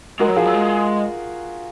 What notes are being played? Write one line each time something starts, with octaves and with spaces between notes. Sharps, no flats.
G#3 F#4 A#4
F#3
F3 F4 G#4
F#3
G#3